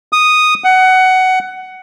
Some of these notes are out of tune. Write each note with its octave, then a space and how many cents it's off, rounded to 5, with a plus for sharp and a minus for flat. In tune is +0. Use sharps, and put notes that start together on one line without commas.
D#6 -5
F#5 +15